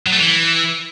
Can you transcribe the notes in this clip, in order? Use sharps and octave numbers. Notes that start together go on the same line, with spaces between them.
F#3
A3
E3